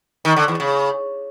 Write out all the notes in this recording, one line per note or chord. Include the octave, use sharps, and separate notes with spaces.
D#3
D3
E2
C#3